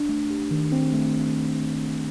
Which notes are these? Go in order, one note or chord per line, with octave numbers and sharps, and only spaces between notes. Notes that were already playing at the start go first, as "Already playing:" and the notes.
Already playing: D4
A3
G4
D#3
C4
A3